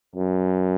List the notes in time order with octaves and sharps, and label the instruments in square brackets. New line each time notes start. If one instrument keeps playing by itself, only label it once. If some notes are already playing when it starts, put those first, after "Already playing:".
[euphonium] F#2